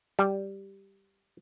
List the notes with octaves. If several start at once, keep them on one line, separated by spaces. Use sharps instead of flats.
G3